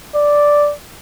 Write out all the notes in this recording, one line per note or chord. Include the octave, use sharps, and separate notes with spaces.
D5